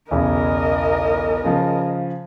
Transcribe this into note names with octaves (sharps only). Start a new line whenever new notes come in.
B1 E2 C#3 A#4 D#5
C#3 F3